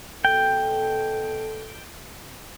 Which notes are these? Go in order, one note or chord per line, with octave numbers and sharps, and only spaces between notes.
B2 A4 G5